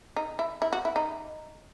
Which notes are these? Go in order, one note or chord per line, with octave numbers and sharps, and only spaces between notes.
D#4
E4
E4
F#4
E4
D#4